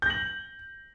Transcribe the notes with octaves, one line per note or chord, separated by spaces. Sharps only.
G6 A#6 F#7